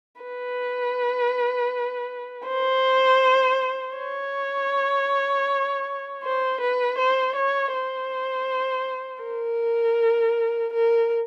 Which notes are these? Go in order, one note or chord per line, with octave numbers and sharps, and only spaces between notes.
B4
C5
C#5
C5
B4
C5
C#5
C5
A#4
A#4